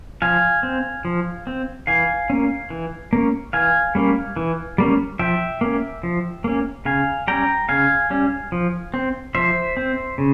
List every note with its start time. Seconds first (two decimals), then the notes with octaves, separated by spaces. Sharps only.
0.22 F3 F5 G#5
0.63 C4
1.05 F3
1.47 C4
1.87 E3 F5 G#5
2.30 A#3 C#4
2.70 E3
3.13 A#3 C#4
3.53 E3 F5 G#5
3.95 G3 A#3 C#4
4.36 E3
4.78 G3 A#3 C#4
5.19 F3 E5 G5
5.61 A#3 C#4
6.03 F3
6.44 A#3 C#4
6.85 C#3 F5 G#5
7.28 G3 C#4 G5 A#5
7.69 C#3 F5 G#5
8.10 G3 C#4
8.52 F3
8.94 C4
9.35 F3 C5 E5
9.77 C4
10.18 C#3